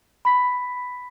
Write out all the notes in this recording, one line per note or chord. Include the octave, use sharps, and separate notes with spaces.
B5 B6